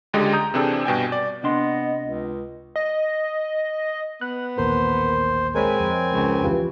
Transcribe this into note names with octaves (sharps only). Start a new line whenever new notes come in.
C#2 D3 G#3 G4 D#5
A#5 D#6 G6
C3 E3 C4 D4 G#4 A4
G2 B2 G5 G#5
D5
C3 B3 D4 D#5 C6
C#2
D#5
B3 F#6
A1 D#2 A#2 A#4 C5
G#3 C4 A#4 C#5 G#5 B5
F2
C#2
F2 E3 F4 G4 B4